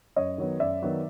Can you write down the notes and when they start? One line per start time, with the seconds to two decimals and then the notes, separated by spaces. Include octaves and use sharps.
0.16 F#2 C#5 D#5
0.38 D#3 F#3 B3
0.60 F#2 D5 E5
0.82 D#3 F#3 B3